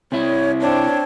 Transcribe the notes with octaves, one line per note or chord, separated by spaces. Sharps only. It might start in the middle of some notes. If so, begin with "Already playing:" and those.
C3 E4 C#5
C4 D4 C#5